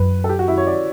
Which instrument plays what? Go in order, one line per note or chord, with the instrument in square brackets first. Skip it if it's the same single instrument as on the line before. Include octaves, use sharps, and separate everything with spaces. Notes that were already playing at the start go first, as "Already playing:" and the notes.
Already playing: [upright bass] F#2 [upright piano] B4
[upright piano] A4
G4
F#4
E4
C#5
D5